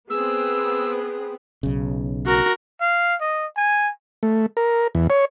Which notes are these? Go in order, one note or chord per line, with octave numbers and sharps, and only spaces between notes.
B3 C4 G#4 E6
B1 C#3
F#4 A#4
F5
D#5
G#5
A3
A#4
E2
C#5